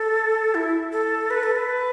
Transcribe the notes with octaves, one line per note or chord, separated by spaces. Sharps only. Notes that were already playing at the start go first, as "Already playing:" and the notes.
Already playing: A4
E4
A4
B4
A4
B4